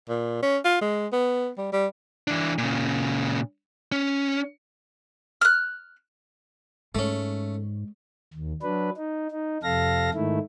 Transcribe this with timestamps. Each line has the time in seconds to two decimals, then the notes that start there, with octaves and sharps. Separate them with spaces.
0.09 A#2
0.42 C#4
0.64 F4
0.81 G#3
1.12 B3
1.58 G3
1.72 G3
2.28 E3 D4
2.58 A#2 C#3
3.92 C#4
5.41 F6 F#6
6.95 G#2 G#3 A3 C#4
8.33 D#2
8.62 F#3 D4 B4
8.97 D#4
9.31 D#4
9.63 F2 C3 A4 F5 A#6
10.14 G#2 D#3 A3 E4